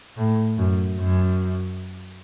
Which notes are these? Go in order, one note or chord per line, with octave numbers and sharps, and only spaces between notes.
A2
F#2
F#2